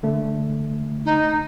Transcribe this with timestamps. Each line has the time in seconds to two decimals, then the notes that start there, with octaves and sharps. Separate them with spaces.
0.03 D3 A3
1.05 D#4